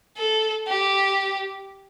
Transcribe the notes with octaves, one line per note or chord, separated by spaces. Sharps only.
A4
G4